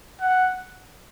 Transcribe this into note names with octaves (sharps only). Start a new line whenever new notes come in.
F#5